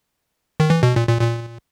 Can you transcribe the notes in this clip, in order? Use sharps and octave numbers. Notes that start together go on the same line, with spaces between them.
D#3
E3
B2
A#2
A#2
A#2